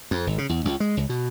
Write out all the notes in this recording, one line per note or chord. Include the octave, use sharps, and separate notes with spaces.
F2
G#1
C#3
E2
C#2
G#3
C#2
B2